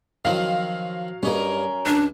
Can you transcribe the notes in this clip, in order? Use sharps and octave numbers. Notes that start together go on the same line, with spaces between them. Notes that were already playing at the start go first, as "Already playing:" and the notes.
D#3 F3 F#3 C4 F5
G2 C#4 D#4 A#4
C#2 D4